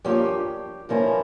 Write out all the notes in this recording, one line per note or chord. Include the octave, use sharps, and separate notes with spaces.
G2 F3 A#3 C#4 G4 G5
G2 F3 A#3 C#4 E4